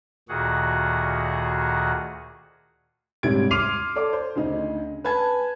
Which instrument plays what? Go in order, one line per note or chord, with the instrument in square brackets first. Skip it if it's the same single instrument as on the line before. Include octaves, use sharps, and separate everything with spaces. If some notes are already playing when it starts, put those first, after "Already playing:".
[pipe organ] D2 A#2 D#3 F#4 G#4 F#5
[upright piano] G#2 C3 G3 C#4 G#6 D7
C6 D6 F6 C7 D#7 F7
A4 D5 D6
C5
D2 C#3 D#4
B4 G#5 A5 G#6